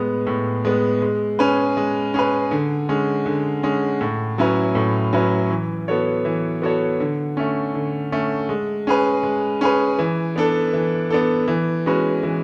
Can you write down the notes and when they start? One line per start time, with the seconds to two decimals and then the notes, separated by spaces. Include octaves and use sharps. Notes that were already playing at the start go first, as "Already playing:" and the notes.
Already playing: A2 G#3 B3
0.27 A2
0.65 G#3 B3
1.02 G#3
1.39 C#4 G#4 B4
1.77 G#3
2.14 C#4 G#4 B4
2.51 D3
2.89 G#3 C#4
3.26 D3
3.63 G#3 C#4
4.01 A2
4.38 F#3 C#4 E4 B4
4.75 A2
5.13 F#3 C#4 E4 B4
5.50 E3
5.88 B3 F#4 A4 C#5
6.25 E3
6.62 B3 F#4 A4 C#5
7.00 D3
7.37 A3 C#4
7.74 D3
8.12 A3 C#4
8.49 G#3
8.87 C#4 G#4 B4
9.23 G#3
9.61 C#4 G#4 B4
9.99 E3
10.36 B3 D4 A4
10.73 E3
11.10 B3 D4 A4
11.48 E3
11.86 G#3 C#4 F#4 B4
12.23 E3